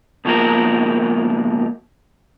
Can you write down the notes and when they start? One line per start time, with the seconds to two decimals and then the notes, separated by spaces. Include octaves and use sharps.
0.25 C#2 B2 F3 G#3 A#3 A#4